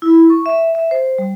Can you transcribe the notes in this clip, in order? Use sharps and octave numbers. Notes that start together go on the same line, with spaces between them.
E4
C#6
E5
E5
C5
G3